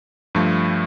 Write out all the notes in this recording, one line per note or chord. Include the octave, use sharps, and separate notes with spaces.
G2 F3 A3